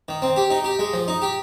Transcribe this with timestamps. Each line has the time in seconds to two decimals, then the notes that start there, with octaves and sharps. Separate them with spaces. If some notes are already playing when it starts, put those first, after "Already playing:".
0.08 D#3
0.22 C4
0.36 G4
0.50 D#4
0.64 G4
0.79 G#3
0.93 F3
1.08 D#4
1.22 G4